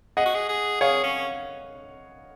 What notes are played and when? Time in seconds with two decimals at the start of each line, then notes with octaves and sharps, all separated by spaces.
0.17 G#4 D#5 F#5
0.26 F#4
0.34 G#4
0.49 G#4
0.81 G#4 C#5 F5
1.03 C#4